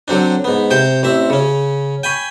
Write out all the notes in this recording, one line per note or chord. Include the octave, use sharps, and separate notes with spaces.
D3 F#3 C4 D4
G#2 B3
C3 C5 G5
A1 C4 E5
C#3 C#4
G5 G#5 B5 C#6